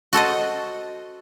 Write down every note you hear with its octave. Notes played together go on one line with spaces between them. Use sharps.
F#4 A4 C5 D#5